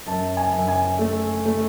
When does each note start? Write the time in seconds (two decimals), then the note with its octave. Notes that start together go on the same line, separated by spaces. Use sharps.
0.07 F#2 A5
0.37 G#5
0.53 F#2
0.68 G#5
0.99 A3
1.45 A3